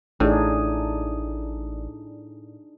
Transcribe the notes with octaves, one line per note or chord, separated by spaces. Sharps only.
A1 A2 D4 D#4 G#4